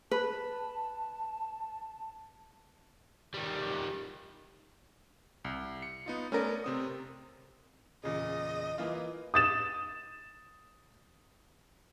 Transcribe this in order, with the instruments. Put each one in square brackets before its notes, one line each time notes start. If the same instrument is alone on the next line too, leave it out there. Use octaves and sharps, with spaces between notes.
[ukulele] B4 [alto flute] A5
[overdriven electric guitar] D#3 G3
[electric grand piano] C2
C#7
B3 D#4 F4
[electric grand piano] A3 B3 D5 [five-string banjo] C#4 A#4
[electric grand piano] C3 C4 D#6
[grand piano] E2 A#2 C#3 [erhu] D#5
[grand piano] E3 A#3 F4
[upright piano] D#6 A6 E7